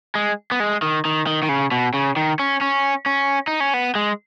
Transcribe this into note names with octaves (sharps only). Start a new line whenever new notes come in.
G#3
B3
G#3
D#3
D#3
D#3
D#3
C#3
B2
C#3
D#3
C#4
C#4
C#4
D#4
C#4
B3
G#3